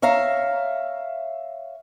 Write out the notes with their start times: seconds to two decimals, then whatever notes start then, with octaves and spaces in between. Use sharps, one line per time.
0.02 C#5 E5 F5 A#5